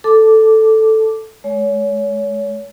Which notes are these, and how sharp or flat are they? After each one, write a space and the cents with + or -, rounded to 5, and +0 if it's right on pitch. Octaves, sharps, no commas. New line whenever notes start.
A4 +0 A5 +0 D6 +0
G#3 +25 C#5 +25